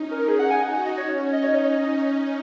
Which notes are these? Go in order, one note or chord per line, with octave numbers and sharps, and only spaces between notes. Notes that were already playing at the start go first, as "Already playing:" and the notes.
Already playing: C#4 D#4
A#4
D#4 G#4
F#5
G#5
F#4 F#5
D#5
C#4 C#5
D#4 D#5
C#5
D#5